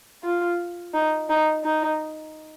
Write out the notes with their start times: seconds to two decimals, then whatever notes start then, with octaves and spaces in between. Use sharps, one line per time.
0.24 F4
0.94 D#4
1.29 D#4
1.64 D#4